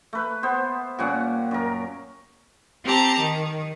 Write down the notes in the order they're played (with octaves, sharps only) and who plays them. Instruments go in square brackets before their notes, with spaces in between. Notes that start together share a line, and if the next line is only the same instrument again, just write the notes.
[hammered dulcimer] A3 B4
B3 C5
A#2 G3 C#4 F#5
F#2 A#4
[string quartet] C4 G4 A5 A#5
D#3